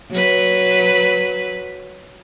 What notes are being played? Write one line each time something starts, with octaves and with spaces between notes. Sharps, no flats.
F#3 B4